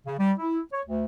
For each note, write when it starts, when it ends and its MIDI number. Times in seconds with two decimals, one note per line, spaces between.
0.06 0.15 49
0.18 0.33 55
0.38 0.59 64
0.72 0.81 73
0.86 1.05 38